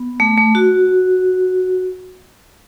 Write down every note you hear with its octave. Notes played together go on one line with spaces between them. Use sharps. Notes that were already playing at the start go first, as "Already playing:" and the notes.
Already playing: B3
A3
A3
F#4